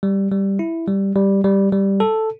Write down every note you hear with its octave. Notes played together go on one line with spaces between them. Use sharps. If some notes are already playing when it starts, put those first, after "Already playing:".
G3
G3
E4
G3
G3
G3
G3
A4